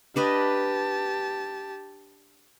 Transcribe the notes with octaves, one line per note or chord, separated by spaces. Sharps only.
D4 G4 B4 D#5 A5